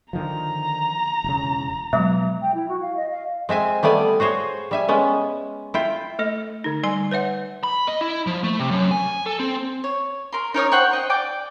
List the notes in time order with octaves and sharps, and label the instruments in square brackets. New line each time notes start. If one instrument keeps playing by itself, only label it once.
[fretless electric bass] D3 D#3 F3 [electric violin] A#5
[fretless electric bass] E1 C#3
[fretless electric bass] B2 [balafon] F3 F#3 G#3 [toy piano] E5
[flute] G5
E4
F#4
F5
D#5
F5
[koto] G#3 C4 E5 G#5
G3 A3 B3 D5 G#5
F#4 G#4 C5 C#5
G3 E5 G#5
G#3 B3 C#4
E4 F4 G5
[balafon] A3 A4 D#5
D3 D#4
G3 G#5 C6
B4 C#5 E5 F#5
[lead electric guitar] B5
D#5
E4
F3
A3
C3
F#2
G#5
A4
C4
[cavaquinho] C#5
A#4 C6
D#4 A#4 C#5 D#6
C5 F#5 G5 C#6
D#5 G5
D5 G5 D6